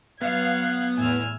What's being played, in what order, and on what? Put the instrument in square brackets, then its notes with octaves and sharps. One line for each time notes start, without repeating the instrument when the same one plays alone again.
[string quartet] F#3 F#6 G#6 [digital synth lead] B3 [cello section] F5
[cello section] E2 A2 [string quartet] G#5 E6 F6